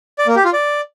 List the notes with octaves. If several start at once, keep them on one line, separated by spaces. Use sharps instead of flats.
D5
A#3
G4
F4
D5